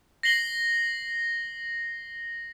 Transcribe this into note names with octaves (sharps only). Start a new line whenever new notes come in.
A#6 C7 F#7 G7